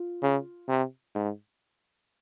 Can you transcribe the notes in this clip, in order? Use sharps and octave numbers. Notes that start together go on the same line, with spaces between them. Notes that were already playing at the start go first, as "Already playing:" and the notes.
Already playing: F4
C#3
C3
G#2